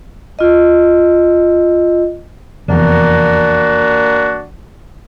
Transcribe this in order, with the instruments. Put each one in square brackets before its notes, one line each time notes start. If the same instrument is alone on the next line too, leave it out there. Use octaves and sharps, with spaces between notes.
[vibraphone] F4 D#5
[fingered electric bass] F1 E2 [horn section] A#3 D4 F#4